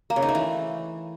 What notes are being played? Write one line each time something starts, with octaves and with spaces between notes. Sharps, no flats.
A#3
C#3
D#4
A3
E3